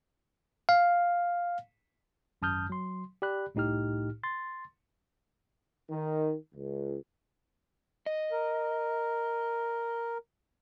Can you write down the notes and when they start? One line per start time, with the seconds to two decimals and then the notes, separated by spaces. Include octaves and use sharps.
0.69 F5
2.42 G#1 F#2 A5 D#6 F6 G6
2.70 F#3 C6
3.22 G4 D5 B5 F#6
3.55 C2 A2 D#4 G4 F6
4.23 C6 A6
5.91 D#3
6.55 C#2
8.06 D#5
8.32 A#4